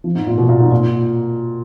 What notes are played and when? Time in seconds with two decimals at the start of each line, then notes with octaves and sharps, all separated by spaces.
0.04 F3
0.15 G#2
0.27 A#2
0.38 B2
0.49 A#2
0.60 G#2
0.72 A#2